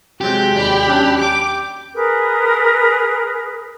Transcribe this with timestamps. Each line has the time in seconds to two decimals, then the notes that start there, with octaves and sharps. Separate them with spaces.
0.21 C3 F#3 G#3 C4 G4 G6
0.53 D#2 D5 B5
0.88 F#3 C#4 D4
1.20 G4 D6
1.94 G#4 A#4 B4